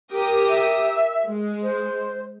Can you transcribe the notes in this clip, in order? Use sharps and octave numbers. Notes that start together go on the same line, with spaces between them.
G4 A#4 D#6
E5
G#3
C5